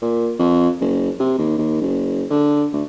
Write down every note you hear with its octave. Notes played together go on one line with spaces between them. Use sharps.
A#2
F2
F#1
C3
D#2
D#2
F#1
D3
D2